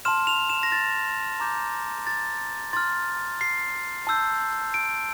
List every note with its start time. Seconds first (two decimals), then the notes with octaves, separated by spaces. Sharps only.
0.05 A5 C6 F6 E7
0.27 F7
0.50 E7
0.63 A#6
0.72 A6
1.40 A#5 D6 G6
2.07 A6
2.73 C6 F6 A6
3.41 C7
4.07 A5 E6 G6
4.74 D7